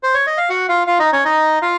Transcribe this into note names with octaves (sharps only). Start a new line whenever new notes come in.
C5
C#5
D#5
F5
F#4 F#5
F4 F5
F4 F5
D#4 D#5
C#4 C#5
D#4 D#5
F4 F5